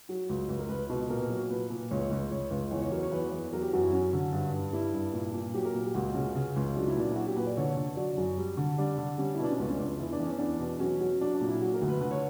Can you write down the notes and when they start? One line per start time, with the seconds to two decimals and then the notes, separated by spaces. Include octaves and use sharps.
0.09 F#3
0.29 C#2
0.49 C#2
0.59 A#4
0.69 C#2 B4
0.89 B2
1.09 A#2 A#4
1.29 F#3
1.50 A#2 B4
1.70 A#2
1.90 C#2 C#5
2.11 C#2
2.31 C#2 C#5
2.50 C#2
2.71 E2 C#5
2.82 C#5
2.91 F#3 A#4
3.02 C#5
3.11 E2 B4
3.31 E2
3.53 F#3 A#4
3.62 G4
3.73 F#2 F#4
3.82 E4
3.92 F#3 C#4
4.13 D3
4.33 G2
4.53 G2
4.73 G3 E4
4.94 G2
5.13 A#2
5.34 A#2
5.54 F#3 G4
5.65 A#4
5.74 A#2 G4
5.85 G4
5.95 C#2 F#4
6.15 C#3
6.35 C#3
6.56 C#2
6.76 F#3 D4
6.87 E4
6.96 A#2 D4
7.11 E4
7.16 F#3 F#4
7.26 G4
7.36 A#2 B4
7.46 D5
7.57 D3 C#5
7.77 D3
7.96 F#3 D5
8.17 F#2
8.38 G3
8.57 D3
8.78 G3 D4
8.98 D3
9.18 G3 C#4
9.35 E4
9.39 B2
9.44 D4
9.51 C#4
9.58 C#2 B3
9.69 C#4
9.79 C#2 D4
9.99 E2 E4
10.12 D4
10.20 E2
10.26 C#4
10.38 E2 D4
10.60 B2
10.80 F#3 C#4
11.00 F#3
11.21 F#3 D4
11.34 D4
11.41 A#2
11.48 E4
11.61 F#3 F#4
11.74 A#4
11.81 D2
11.88 B4
12.01 D3 B4
12.11 C#5